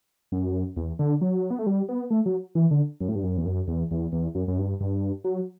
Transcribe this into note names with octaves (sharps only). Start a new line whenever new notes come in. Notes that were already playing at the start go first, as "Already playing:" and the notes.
F#2
E2
D3
F#3
B3
A3
G3
B3
A3
F#3
E3
D3
F#2
A2
G2
F#2
E2
F#2
E2
E2
E2
F#2
F#2
G2
G2
F#3